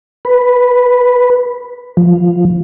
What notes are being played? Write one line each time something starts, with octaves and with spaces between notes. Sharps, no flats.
B4
F3